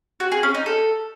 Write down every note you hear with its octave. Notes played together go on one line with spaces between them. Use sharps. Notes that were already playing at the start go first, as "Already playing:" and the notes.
F#4
G#4
C#4
D#4
A4